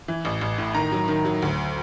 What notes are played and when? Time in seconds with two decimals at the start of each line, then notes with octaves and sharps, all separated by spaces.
0.08 E3
0.25 A1
0.41 A1
0.58 A2
0.74 D#3 A#5
0.92 F#3
1.08 D#3
1.25 F#3
1.42 D2